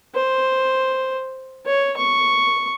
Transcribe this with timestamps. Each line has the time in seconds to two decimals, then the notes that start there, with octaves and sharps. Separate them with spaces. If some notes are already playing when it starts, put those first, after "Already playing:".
0.15 C5
1.66 C#5
1.97 C#6